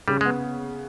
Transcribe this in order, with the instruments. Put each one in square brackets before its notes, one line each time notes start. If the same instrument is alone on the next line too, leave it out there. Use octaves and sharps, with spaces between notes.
[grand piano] C#3 [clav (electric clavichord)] G3
[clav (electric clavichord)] G#3
[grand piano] B3